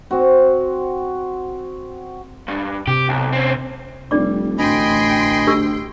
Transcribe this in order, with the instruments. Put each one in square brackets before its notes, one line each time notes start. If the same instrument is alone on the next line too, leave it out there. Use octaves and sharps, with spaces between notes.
[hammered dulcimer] C4 F#4
[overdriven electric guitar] G2
[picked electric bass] C3 [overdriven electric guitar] G4
[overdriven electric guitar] B1
C4 C#4
[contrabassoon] F1 [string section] G3 [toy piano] D4 D5 D6
[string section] A1 G5 C6 [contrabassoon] D2 [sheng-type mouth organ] D#5 G#5 B5
[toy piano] D4 G4 E6